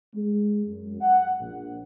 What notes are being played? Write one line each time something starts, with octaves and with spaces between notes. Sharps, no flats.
G#3
F#2
F#5
A#1